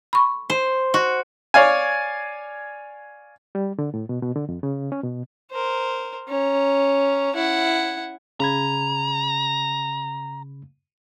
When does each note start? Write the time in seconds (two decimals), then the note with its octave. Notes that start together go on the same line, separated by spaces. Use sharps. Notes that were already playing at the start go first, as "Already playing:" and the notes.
0.13 B5 C#6
0.50 C5
0.94 F#4
1.54 C#5 D5 F5 G#5
3.55 G3
3.79 D3
3.94 A2
4.09 B2
4.22 B2
4.36 D3
4.49 F2
4.63 C#3
4.92 C#4
5.04 B2
5.51 A#4 C5
6.28 C#4 A#5
7.35 E4 F#5
8.40 C#3 A#5 B5 G#6